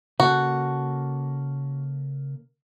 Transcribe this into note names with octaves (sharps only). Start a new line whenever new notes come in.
C#3 A#3 F#4 A4